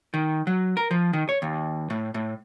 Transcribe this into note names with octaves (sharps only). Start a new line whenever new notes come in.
D#3
F#3
A#4
F3
D#3
C#5
D#2
A2
A2